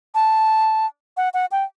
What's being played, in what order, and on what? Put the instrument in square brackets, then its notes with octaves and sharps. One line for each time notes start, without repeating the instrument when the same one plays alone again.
[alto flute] A5
F#5
F#5
G5